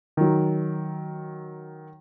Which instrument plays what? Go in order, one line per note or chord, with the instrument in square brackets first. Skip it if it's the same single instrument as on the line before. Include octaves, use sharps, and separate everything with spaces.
[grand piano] D#3 F#3